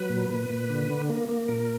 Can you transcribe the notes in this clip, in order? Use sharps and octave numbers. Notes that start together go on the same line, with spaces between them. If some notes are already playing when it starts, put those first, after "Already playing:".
Already playing: F#3 B4
A#2
A#2
A#2
D3
D3
A#3
A#3
A#2 A#4